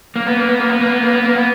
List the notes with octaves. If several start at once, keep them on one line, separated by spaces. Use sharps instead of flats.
A#3
B3
A#3
B3
A#3
B3
A#3
B3
A#3
B3
A#3
B3